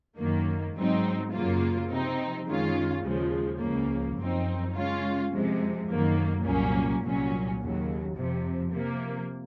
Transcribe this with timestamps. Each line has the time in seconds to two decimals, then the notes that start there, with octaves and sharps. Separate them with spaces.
0.18 F#2 D#3 A#3
0.75 G#2 F#3 C4 D#4
1.32 F#2 C#3 F#3 A#3 F4
1.90 C3 F3 C4 D#4
2.47 F#2 D#3 G#3 C#4 F4
3.03 D#2 C#3 F3 G#3
3.60 C#2 C#3 F3 A#3
4.17 F#2 F3 C4 D#4
4.75 C#3 G#3 C#4 F4
5.31 F2 C3 F3 G#3
5.88 F#2 D#3 F#3 A#3
6.46 C2 A#2 F#3 A#3 C#4
7.03 C2 A#2 F#3 C#4
7.60 D#2 C#3 F#3
8.16 F2 C3 F3
8.73 C3 F3 A#3